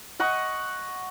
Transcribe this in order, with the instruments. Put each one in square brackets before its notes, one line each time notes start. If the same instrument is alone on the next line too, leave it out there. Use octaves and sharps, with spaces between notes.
[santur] D#5 F#5 C#6